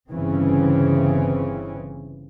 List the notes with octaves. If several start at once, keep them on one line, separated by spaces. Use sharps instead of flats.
G1 C#3 E3 C4 C#4